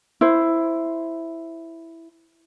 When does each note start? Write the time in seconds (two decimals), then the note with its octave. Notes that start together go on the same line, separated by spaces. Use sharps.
0.21 E4 C5